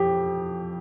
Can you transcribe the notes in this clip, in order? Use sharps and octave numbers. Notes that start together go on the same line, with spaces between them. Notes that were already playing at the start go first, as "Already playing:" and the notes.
Already playing: F2 G4